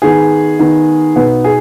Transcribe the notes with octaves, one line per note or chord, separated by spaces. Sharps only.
D#3 B3 D#4 G#4
D#3 B3 D#4
B2 B3 D#4 B4
G#4